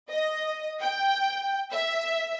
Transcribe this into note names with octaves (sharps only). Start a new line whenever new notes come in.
D#5
G5
E5